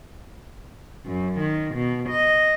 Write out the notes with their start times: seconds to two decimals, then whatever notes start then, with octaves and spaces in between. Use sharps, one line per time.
1.07 F#2
1.42 D#3
1.77 B2
2.10 D#5